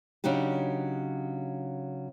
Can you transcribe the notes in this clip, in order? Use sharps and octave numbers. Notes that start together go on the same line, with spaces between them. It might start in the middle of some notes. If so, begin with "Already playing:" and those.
C#3 F#3 D4 D#4 G4